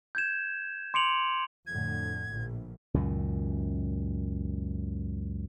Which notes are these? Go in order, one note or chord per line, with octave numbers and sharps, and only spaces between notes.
G6 G#6 E7
C6 D6 C#7 D7 F7 F#7
F2 A2 D3 G#6
A#1
C#2 F#2 A#2 D#3